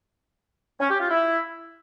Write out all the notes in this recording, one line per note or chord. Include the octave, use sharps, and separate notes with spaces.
C#4
G4
F4
E4